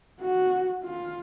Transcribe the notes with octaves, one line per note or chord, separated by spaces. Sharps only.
F#4
F4